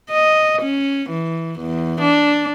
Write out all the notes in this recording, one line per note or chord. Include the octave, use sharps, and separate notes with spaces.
D#5
C#4
E3
E2
D4